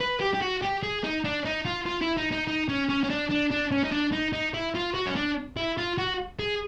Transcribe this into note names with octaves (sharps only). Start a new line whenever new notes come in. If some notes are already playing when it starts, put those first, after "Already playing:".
B4
G4
G4
F#4
G4
G#4
D#4
D4
D#4
F4
F4
E4
D#4
D#4
D#4
C#4
C#4
C#4
D4
D4
D4
C#4
D#4
D4
D#4
D#4
E4
F4
F#4
C#4
D4
E4
F4
F#4
G#4